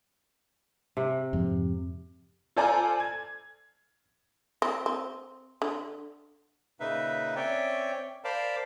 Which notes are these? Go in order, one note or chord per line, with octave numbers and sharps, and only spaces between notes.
C3
F2 G#2 F3
F4 A4 C5 D5 G#5 A#5
G#6
C4
C4
D3
A#2 C#3 D#4 B4 E5
C4 C#4 C#5 D5 E5 G5
A#4 C5 D5 F5 A5 B5